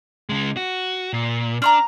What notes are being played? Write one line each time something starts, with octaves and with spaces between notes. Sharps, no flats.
C#3 G#3
F#4
A#2
D4 A#5 C6 F6